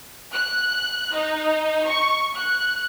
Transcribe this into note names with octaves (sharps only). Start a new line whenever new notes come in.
F#6
D#4
C#6
F#6